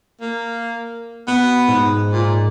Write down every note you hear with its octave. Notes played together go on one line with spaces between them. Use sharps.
A#3
B2 B3
G#2
A#2